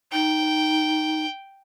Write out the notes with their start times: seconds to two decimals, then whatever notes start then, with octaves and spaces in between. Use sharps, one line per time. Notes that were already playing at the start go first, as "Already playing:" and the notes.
0.12 D#4 G5